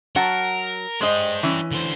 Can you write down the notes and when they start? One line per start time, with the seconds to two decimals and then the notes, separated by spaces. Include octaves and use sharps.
0.16 F#3 A#4 F#5 A5
1.01 G#3 D4 C5 D#5 G5
1.43 E3 C#4
1.72 D3 C5